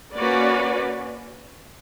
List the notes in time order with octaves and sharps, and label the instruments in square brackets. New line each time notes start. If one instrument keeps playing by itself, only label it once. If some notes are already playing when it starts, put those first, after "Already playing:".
[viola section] A#3 C#4 F#4 B4 D5